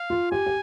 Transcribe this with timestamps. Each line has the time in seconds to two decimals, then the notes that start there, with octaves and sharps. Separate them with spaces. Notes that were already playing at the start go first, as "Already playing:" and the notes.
Already playing: F5
0.10 F4
0.31 G4 G#5
0.46 G4